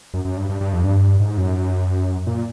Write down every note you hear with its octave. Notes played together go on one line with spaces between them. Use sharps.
F#2
F#2
G2
G2
G2
F2
G2
G#2
F#2
A#2